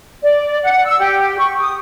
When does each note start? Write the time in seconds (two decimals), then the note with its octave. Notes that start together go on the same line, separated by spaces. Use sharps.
0.23 D5
0.63 F#5
0.86 E6
1.00 G4
1.38 C#6
1.59 D#6